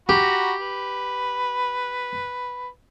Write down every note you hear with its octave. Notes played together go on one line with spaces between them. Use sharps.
F#4 G4 A#5 B5
B4